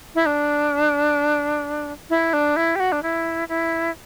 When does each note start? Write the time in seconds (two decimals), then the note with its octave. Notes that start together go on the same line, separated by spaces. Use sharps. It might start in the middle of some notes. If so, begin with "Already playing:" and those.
0.15 E4
0.26 D4
2.10 E4
2.33 D4
2.56 E4
2.76 G4
2.80 F#4
2.92 D4
3.03 E4
3.49 E4